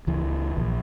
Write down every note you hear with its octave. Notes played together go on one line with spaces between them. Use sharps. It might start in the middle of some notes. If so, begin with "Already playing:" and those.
C#2 E3
A#1